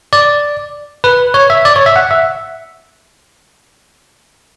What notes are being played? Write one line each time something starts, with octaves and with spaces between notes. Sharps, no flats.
D5
B4
C#5
E5
D5
C#5
E5
F#5
E5